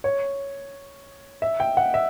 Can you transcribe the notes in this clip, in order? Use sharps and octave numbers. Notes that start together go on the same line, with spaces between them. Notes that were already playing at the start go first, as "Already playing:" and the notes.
C#5
E5
G5
F#5
E5